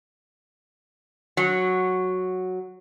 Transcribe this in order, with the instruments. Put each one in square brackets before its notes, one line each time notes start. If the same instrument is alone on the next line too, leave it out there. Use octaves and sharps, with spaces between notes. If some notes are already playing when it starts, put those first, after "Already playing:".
[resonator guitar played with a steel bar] F#3